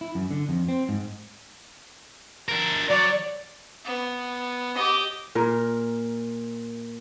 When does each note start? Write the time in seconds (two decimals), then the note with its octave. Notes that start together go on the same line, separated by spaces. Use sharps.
0.01 E4
0.15 F#2
0.31 D3
0.49 F2
0.69 C4
0.89 G#2
2.49 D4 A#4
2.90 F#3 C#5 D5
3.84 B3
4.75 G4 D#5
5.35 A#2 A#4